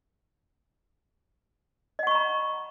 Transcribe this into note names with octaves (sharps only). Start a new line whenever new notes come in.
D#5 F#5 A#5 B5 C#6